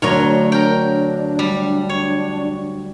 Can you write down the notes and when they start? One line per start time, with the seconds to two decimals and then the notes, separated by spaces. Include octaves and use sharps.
0.02 D2 F#3 D4 A#4 C#5
0.52 A#4 G5
1.39 G3
1.89 C#5